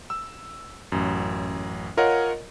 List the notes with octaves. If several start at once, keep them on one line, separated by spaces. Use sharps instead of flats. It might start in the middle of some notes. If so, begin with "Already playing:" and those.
E6
A1 F#2
F4 A#4 C#5 D#5 F5 F#5